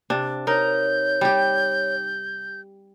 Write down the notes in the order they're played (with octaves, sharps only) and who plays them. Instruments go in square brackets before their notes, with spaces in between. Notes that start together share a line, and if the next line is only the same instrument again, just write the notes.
[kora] C3 D4
[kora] D#4 A#4 [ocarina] C#5 [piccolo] G6
[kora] G3 G4